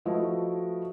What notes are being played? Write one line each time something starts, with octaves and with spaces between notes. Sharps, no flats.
F3 A3 E4 F#4 B4 D#5